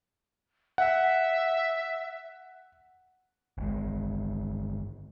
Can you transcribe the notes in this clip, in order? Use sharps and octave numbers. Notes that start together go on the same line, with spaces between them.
E5 F#5
G1 G#3